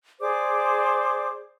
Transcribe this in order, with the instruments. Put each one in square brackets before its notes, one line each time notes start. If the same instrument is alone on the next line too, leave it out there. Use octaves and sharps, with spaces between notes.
[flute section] G#4 C5 D5 D6